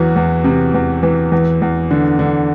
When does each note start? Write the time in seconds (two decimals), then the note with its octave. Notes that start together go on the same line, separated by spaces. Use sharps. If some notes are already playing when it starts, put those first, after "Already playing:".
Already playing: E2 E3 F#3 F#4
0.16 E2
0.44 C3
0.74 E2
1.03 E3
1.32 E2
1.62 E2
1.91 D3
2.19 D3